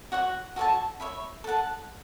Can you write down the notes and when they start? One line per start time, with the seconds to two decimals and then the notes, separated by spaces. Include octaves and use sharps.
0.12 F#4 C#5 F#5 C#6
0.56 F#4 A4 C#5 A5
1.00 C#5 E5 B5
1.44 A4 F#5 A5